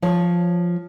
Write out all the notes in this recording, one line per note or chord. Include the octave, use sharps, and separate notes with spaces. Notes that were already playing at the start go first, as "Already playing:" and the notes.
F3 C#5